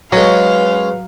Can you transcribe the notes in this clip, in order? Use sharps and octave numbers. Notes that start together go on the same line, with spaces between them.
F#3 G#3 C#4 B4 F5